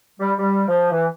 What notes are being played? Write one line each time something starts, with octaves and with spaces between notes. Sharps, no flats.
G3
G3
F3
E3